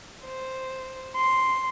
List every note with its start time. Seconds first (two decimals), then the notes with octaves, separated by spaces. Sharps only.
0.24 C5
1.16 C6